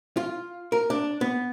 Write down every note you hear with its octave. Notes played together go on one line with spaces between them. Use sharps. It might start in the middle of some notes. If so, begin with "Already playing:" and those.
F4
A#4
D4
B3